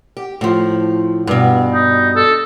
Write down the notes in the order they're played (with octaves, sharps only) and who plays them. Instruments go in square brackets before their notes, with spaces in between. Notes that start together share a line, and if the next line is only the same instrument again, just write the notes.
[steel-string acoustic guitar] G4
A2 F3
G2 B2
[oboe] D#4
A4